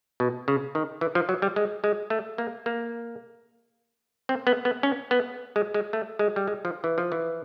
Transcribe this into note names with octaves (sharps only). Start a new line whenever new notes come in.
B2
C#3
D#3
E3
F3
F#3
G3
G#3
G#3
A3
A#3
A#3
C4
B3
B3
C#4
B3
G#3
G#3
A3
G#3
G3
G#3
F3
E3
F3
E3